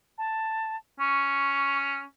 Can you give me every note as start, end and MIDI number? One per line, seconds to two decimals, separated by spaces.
0.18 0.76 81
1.00 2.04 61
1.00 1.78 85